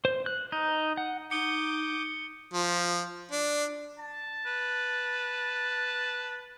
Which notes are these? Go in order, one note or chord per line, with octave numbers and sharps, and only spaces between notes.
C5
F#6
D#4
F#5
D#4 D6 D#6 G6 C#7 G7
F3
D4
A5
B4